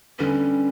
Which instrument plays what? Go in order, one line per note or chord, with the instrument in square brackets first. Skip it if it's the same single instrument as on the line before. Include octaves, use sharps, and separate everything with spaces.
[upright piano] D3 G3 B3 [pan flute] C#4